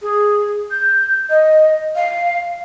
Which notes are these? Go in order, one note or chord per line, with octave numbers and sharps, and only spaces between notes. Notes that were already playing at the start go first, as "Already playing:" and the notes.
G#4
G6
D#5
F5